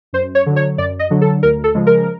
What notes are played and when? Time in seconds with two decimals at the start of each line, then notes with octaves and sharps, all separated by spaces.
0.13 F#2 C5
0.35 C#5
0.46 D3 F#3
0.56 C#5
0.78 F#2 D5
0.99 D#5
1.10 D3 F#3
1.21 A4
1.43 D2 A#4
1.64 A4
1.75 C#3 F3 G#3
1.87 A#4